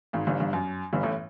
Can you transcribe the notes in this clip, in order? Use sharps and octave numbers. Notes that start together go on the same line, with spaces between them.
G#1 G#2
G1 G2
G1 G2
F#2
G1 G2
A1 A2